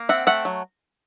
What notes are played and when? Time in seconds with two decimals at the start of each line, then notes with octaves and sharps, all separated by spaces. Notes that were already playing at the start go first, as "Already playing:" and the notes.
Already playing: A#3
0.09 C4 E5 F#5
0.27 A3 E5 F#5
0.45 F#3